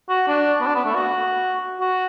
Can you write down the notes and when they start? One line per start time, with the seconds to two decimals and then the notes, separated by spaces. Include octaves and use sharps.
0.09 F#4
0.28 D4
0.61 B3
0.67 D4
0.75 B3
0.85 A3
0.95 F#4
1.80 F#4